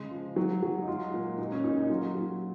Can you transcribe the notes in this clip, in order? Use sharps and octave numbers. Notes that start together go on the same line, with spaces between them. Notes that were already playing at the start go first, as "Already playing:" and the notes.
Already playing: C#3 G#3
F3
F#3
F#3
D#4
G#3 F4
A#2
A#2 D#4
C#4
A#2 D#4
D#4
F#3 F4
F#3